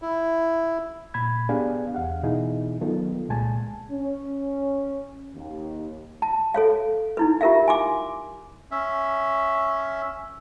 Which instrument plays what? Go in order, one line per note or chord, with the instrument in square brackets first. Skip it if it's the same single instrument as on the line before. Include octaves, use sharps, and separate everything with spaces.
[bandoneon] E4
[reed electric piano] A#2 B5 G#6
B3 D4 G4 G#4 F5 G#5
E2 F5 F#5
B2 E3 D#4 E4 G#4
D#3 F#3 B3 F4 A4
C2 A#2 G#3 G#5 A5
[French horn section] C#4
D#2
[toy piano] A5
A4 C#5 F5
D#4 E4 B4
F4 G4 A#4 E5 F5
G#5 C6 D6
[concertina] C#4 E5